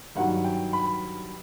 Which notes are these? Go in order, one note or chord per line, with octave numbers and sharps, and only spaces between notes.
G2 D#3 F#3 F#5
G5
B5